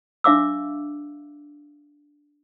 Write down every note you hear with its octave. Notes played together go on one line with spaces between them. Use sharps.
D4 E5 F5 D6 E6